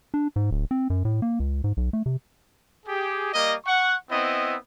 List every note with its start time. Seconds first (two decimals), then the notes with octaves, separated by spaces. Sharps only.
0.14 D4
0.36 G#2
0.51 D1
0.71 C4
0.90 F#2
1.05 A2
1.22 A#3
1.40 C#2
1.64 G#2
1.77 B1
1.93 A3
2.06 C3
2.86 G4 G#4
3.33 G3 A#3 D#5
3.66 F#5 C#6
4.10 B3 C4 E4 D#5